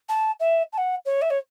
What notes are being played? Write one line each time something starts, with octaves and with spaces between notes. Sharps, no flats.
A5
E5
A5
F#5
C#5
E5
C#5